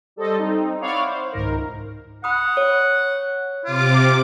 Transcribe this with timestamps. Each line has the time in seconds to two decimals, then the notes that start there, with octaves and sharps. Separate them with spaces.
0.16 G3 A4 C5 D#5
0.38 C4 D#4
0.80 E4 C#5 D5 F5 F#5
1.04 C5
1.32 C#2 G#2 D#3 A#4
2.24 F#5 B5 D#6
2.57 C#5
3.65 C3 F4 D6